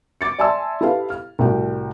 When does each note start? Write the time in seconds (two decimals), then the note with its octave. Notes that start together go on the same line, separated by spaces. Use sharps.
0.21 D6 A6 C#7
0.38 D5 E5 G#5 A5 C6 E6
0.81 E4 G4 A4 B4 F5
1.10 F6
1.39 C2 A2 F#4 G5